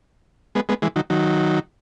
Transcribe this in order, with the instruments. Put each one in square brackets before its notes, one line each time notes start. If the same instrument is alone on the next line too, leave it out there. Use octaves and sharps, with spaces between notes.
[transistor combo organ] G#3 B3
G#3 B3
E3 G#3
D#3 F#3
D#3 F#3